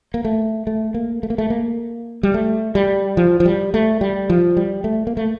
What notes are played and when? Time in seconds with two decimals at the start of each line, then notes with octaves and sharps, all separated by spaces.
0.14 A#3
0.25 A3
0.67 A3
0.94 A#3
1.23 A3
1.30 A#3
1.38 A3
1.50 A#3
2.23 G3
2.34 A3
2.75 G3
3.17 F3
3.40 F3
3.45 G3
3.74 A3
4.01 G3
4.30 F3
4.57 G3
4.84 A3
5.07 A#3
5.17 A3